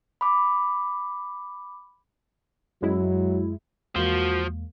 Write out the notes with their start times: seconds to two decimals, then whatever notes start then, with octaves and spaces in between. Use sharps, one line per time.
0.21 B5 D6
2.82 F#2 F#3 G#3 E4
3.96 E2 F3 G#3 A#3 F#4